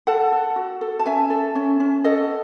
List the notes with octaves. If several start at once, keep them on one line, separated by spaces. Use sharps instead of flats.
A4 F#5 A5
A4
F#4
A4
A5
C#4 E5 G#5
A4
C#4
C#4
A4 D#5 F#5